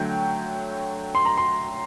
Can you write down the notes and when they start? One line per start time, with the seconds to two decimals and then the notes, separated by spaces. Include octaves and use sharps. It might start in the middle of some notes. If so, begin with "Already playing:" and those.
Already playing: D3 F#3 A3 G5
1.15 C6
1.25 A#5
1.37 C6